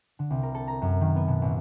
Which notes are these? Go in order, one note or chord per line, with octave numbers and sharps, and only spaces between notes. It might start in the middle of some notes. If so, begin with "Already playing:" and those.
D3
C2
A#4
A4
A#5
F#2
D#3
B3
B2
A1